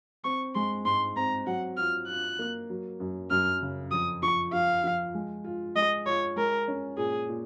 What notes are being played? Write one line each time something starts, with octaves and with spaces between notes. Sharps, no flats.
C4 C#6
G#3 C6
G#2 C6
C4 A#5
F#3 F#5
F4 F6
F4 F#6
A#3
F#3
F#2
F#2 F6
C#3
F2 D#6
F3 C#6
F3 F5
F3
G#3
F4
G#3 D#5
F4 C#5
G#3 A#4
C#4
A#2 G#4
A#2